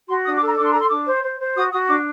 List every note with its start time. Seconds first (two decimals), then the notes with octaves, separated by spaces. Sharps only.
0.08 F#4 C6
0.24 D4 D#6
0.36 D6
0.41 A4
0.47 A#5
0.57 D4 D6
0.64 C6
0.72 A4 A#5
0.79 C6
0.90 D4 D6
1.07 C5
1.23 C5
1.39 C5
1.56 F#4 D#6
1.72 F#4 D#6
1.88 D4 D6